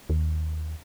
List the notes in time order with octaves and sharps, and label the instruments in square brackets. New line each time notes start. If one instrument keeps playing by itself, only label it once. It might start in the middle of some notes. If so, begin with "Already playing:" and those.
[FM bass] D#2